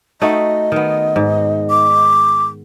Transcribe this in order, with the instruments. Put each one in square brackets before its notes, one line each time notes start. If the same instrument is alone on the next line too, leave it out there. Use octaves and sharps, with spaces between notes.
[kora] A3 D#4 F#4 [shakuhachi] D#5
[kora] D#3 B3
G#2
[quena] D6